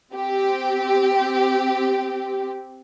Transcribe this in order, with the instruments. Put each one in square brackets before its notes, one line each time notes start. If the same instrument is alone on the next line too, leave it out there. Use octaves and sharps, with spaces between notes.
[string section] C4 G4